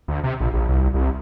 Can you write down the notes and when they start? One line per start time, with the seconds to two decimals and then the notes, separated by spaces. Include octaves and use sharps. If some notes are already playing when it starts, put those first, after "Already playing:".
0.08 D2
0.24 C3
0.40 A#1
0.54 A#1
0.69 C2
0.94 C2